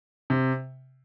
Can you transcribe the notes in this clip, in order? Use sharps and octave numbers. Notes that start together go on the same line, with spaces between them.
C3